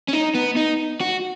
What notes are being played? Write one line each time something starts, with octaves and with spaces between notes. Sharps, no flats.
C#4
D#4
B3
D#4
F#4